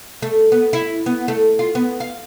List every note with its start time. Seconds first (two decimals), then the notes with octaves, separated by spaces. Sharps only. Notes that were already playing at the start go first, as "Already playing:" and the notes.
0.22 A3
0.52 B3
0.73 E4
1.06 B3
1.28 A3
1.59 F4
1.75 B3
2.00 F5